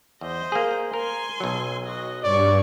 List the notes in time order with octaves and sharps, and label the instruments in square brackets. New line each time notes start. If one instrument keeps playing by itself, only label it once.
[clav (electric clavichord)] E2 [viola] C5 D#5
[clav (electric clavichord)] A#3 G#4
[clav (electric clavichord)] A#4 [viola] G#5 C6
[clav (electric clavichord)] B1 F#3
[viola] F#4 D#5
[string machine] G2 [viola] C#5 C#6 [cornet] D5